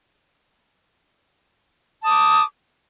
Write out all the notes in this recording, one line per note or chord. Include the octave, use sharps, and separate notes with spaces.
A5 D6 D#6